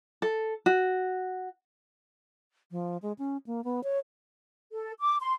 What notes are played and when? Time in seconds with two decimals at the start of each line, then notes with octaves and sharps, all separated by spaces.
0.22 A4
0.66 F#4
2.71 F3
3.02 G#3
3.19 C#4
3.46 A#3
3.64 B3
3.84 C#5
4.72 A4
5.00 D6
5.21 C6